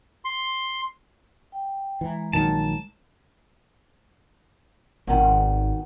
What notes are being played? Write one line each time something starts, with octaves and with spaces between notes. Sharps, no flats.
C6
G5
E3 G#3 A#5
A#1 D#3 F#3 A5
G#1 B2 D#3 C4